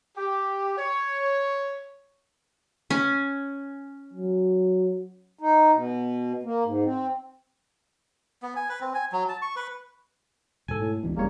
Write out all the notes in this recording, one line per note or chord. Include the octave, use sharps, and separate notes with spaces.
G4
C#5
C#4
F#3
D#4
B2
A#3
G#2
C4
B3
G#5
B4
C4
G#5
F#3
A5
C#6
B4
G#2 B2 A4 G#5
A2
E1 C#2 E3 C#4 D4
D#1 C#3 G3 A#3 C#5